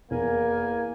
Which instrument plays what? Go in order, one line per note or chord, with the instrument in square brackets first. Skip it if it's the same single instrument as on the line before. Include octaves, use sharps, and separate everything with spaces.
[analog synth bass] F1 [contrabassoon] E2 [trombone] A#3 [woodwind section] A#4 G#5